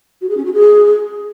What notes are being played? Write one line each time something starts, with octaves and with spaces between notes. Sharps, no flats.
F#4
G#4
C#4
F#4
G#4